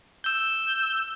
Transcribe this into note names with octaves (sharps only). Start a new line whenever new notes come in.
E6 G6